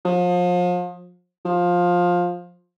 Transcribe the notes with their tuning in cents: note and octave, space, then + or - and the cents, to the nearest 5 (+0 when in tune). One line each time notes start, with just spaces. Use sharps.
F3 +35
F3 +15